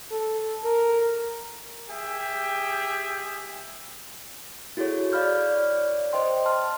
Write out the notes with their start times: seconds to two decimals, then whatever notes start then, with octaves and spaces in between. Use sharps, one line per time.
0.12 A4
0.64 A#4
1.89 G4 G#4 E5 G5
4.77 E4 F#4 G#4 A4 C#5
5.12 D5 F5 B5 F6 G6
5.38 C#5 D5
6.13 C5 D#5 G5 C6
6.45 A5 C6 F6